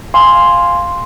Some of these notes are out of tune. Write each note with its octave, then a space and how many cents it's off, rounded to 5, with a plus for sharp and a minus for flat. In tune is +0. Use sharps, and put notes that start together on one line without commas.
F5 +0 G#5 +0 C6 +0